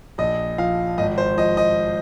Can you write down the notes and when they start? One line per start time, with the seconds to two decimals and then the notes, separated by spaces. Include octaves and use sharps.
0.18 A#1 D#5
0.58 F3 F5
0.98 G#1 D#5
1.18 C5
1.37 F3 D#5
1.57 D#5